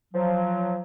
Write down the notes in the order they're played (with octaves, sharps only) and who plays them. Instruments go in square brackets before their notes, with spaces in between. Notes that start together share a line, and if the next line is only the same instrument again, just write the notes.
[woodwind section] F3 F#3